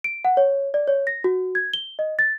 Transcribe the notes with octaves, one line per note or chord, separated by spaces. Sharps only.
D7
F#5
C#5
D5
C#5
A#6
F#4
G#6
G7
D#5
A6